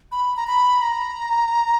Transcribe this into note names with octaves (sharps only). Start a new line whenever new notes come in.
B5
A#5
B5
A#5